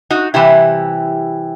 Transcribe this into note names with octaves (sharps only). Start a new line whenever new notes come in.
D#4 F#4
C3 E3 G3 E4 G4